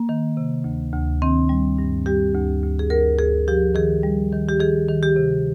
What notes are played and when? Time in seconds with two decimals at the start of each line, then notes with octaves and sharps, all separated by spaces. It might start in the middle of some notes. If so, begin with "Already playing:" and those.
Already playing: A#3
0.09 D#3
0.37 C3
0.64 D2
0.93 D2
1.22 D#3 C4
1.49 G3
1.78 G2
2.06 G3 G4
2.34 D2
2.63 D2
2.79 G#4
2.90 D2 A#4
3.18 D2 G#4
3.48 F3 G4
3.75 D#3 G#4
4.03 G3
4.32 D#3
4.49 G4
4.60 D#3 G#4
4.88 D#3
5.03 G4
5.16 C3